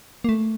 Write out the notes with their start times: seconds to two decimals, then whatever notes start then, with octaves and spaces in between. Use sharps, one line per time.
0.24 A#3
0.29 A3